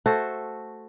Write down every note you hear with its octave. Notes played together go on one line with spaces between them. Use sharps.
A3 F#4 A4 C5